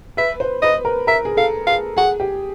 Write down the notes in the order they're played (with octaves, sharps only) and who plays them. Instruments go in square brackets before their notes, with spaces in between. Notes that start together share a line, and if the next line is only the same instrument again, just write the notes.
[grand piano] B4 [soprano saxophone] E5
[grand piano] C5
[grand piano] B4 [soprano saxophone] D#5
[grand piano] A#4
[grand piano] A#4 [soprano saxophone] E5
[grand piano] G#4
[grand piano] A4 [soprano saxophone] F5
[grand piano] G#4 [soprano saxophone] F5
[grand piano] G#4 [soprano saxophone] F#5
[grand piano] G4